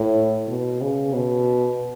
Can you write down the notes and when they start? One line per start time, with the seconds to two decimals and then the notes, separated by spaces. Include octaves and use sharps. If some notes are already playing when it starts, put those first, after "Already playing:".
Already playing: A2
0.48 B2
0.81 C#3
1.14 B2